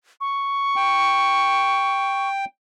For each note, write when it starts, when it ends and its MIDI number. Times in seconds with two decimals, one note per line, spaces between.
0.21 2.29 85
0.76 2.45 79